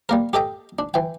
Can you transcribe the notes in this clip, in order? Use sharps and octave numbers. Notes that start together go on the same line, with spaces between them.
G3 A#3 A#4
G4 A4 D#5 G5
D4
E3 G5